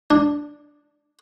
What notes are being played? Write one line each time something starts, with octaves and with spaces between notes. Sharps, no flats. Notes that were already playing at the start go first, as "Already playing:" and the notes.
D4